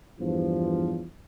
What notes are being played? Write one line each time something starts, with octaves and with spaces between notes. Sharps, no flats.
E2 G2 F3